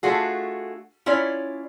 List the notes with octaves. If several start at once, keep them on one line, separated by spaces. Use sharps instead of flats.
A3 D4 F4 F#4 G#4
C#4 E4 F4 C#5 D5